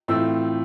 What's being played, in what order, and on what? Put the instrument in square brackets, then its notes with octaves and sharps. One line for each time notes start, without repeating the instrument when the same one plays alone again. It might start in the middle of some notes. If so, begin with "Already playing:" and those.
[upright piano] A2 E3 A3 C4 F4 E6